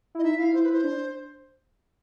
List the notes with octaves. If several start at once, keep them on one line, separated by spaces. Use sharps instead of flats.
E4
D#5
D#4 E5
E4 F5
E4 C5
B4
E4
C5
D4